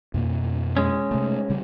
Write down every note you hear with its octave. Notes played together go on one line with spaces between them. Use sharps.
F2 B2 A#3
G#3 C#4
C3 A3
C#3 G3